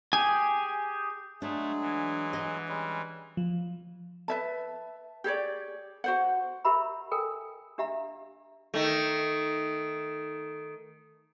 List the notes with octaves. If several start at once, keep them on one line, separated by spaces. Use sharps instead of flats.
G4 G#4 G#5
F#3 G#3 A3 D4 G#4
E3
D#5
G3 G#3 C#4
F3
B4 E5 A5
G4 G#4 C#5 D5
F#4 C5 F#5
G4 A#4 E5 A#5 B5
A4 A#4 G5 G#5
D4 G4 E5 F5 A#5
D#3 A3